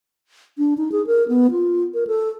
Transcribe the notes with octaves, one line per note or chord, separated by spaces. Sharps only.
D4
D#4
G#4
A#4
B3
F4
A#4
A4